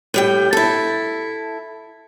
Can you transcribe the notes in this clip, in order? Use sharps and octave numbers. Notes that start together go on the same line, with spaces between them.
A2 G3 G5
E4 A4